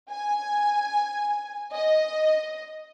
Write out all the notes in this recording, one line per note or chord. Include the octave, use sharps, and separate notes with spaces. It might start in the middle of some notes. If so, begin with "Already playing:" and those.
G#5
D#5